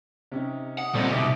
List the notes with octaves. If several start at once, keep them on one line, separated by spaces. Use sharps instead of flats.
C3 C#4 D#4
F#5 D#6
A#2 G3 C4 C#4 A4 C5 D5 D#5
C2 B2 D#3 G4 E5 D#6